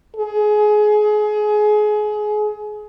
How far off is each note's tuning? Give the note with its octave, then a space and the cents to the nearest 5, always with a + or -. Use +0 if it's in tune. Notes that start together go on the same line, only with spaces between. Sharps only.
G#4 +25